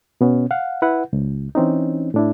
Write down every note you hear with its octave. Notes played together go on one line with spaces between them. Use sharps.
B2 B3 C#4
F5 F#5
E4 B4 F#5
C#2
E3 C4 C#4 D#4
A2 D4 E4